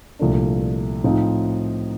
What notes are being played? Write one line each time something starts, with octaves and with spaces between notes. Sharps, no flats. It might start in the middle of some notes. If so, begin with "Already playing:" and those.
C2 A#2 F3 A3 D4
A2 F3 C4 D#4